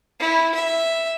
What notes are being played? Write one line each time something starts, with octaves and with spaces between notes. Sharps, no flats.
E4
E5